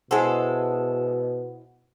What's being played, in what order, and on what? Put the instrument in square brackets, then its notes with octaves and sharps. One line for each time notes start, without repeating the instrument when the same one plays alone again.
[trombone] B2 [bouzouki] G#3 A4 [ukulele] E4 G#4 C5 [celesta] F#5